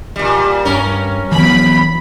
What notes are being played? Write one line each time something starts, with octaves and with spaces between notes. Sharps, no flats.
A#2 G3
G2 C#4 A#4
E3 F#3 B3 B5